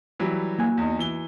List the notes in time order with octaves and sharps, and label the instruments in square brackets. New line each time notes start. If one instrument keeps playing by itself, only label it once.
[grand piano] E3 F#3 G3
[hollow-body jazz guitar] A#3 F#4 G#5
[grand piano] E2 D#4
E3 G7